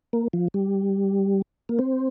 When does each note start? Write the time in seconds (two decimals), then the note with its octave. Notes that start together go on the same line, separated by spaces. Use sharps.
0.13 A#3
0.33 F3
0.54 G3
1.69 A#3
1.79 C4